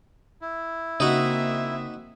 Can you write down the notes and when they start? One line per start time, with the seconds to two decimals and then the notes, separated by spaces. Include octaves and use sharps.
0.41 E4
1.00 C#3 A#3 C4 D#4 F#4 E5